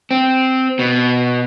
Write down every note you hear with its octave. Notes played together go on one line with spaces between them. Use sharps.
C4
B2